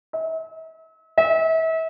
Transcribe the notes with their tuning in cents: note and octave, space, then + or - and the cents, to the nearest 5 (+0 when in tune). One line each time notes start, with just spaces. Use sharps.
E5 -40
E5 -35